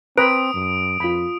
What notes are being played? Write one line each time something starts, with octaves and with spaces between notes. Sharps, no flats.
C4 B4 A#5 B5 D#6 D7
F#2
F2 F4 B5